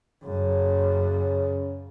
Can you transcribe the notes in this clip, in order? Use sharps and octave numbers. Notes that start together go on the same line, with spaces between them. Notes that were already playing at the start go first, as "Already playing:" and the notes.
F#2 C#3